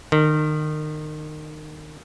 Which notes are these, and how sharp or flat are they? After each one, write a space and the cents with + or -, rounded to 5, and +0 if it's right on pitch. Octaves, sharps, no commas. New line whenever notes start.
D#3 -25